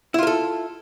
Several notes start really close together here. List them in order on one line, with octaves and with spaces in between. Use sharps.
E4 F4 A#4 A4